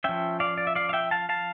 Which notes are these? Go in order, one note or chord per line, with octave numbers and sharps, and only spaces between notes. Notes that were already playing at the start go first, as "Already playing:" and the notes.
F3 C#4 E5 G5
D5 F5
D5
E5
D5 F5
F5
E5 G5
F5 A5
F5 A5